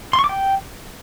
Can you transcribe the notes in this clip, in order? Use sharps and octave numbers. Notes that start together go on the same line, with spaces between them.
C6
C#6
D6
G5